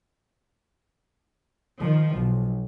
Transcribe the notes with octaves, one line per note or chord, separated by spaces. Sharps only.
D#3 F3
B1